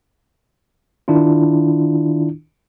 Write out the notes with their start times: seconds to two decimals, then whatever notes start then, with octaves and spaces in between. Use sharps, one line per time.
1.08 D#3 D4 E4 F4